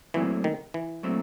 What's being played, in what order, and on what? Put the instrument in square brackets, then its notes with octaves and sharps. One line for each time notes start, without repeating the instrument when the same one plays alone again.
[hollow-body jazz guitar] A#2 F#3 A3 C4 E4 [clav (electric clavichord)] E3
[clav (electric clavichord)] D#3
E3
[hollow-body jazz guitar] A#2 F#3 A3 C4 E4